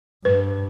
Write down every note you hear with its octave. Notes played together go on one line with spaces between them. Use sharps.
G2 B4